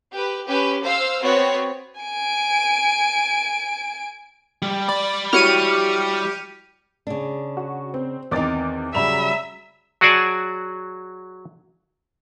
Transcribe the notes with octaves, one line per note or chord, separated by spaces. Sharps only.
G4 B4
C#4 G4 B4
C5 F5 E6
B3 C4 F#4 C#5
G#5 D7
G3
G3 D5 B5
E4 F#4 G4 C#5 F6 C#7 D#7
C#3 D4
F#4
C4
E2 D#3 C4 D#4 D6 A6
C#3 F#3 G3 E5 A#5 B5 F7
F#3 F#4 G#4 D5 G#5 A5